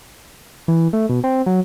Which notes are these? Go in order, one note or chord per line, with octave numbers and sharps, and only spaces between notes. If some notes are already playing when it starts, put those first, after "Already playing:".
E3
A3
B2
C4
F#3